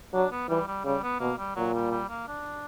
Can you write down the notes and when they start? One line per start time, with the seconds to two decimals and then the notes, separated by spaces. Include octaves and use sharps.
0.13 F#3 D4
0.31 B3
0.49 E3 G3
0.68 G3
0.84 C#3 G3
1.03 B3
1.20 B2 A#3
1.38 G3
1.56 A#2 F#3
1.74 G3
1.91 G3
2.09 A#3
2.28 D4